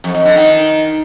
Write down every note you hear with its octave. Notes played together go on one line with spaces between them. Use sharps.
F2
F2
D3
D#3